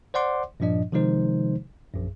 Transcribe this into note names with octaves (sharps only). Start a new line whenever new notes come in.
C5 D5 F#5 C6 D6
G2 A#2 F3 D4 D#5
C3 D#3 F3 G#3 D#4 C5
A#1 F#2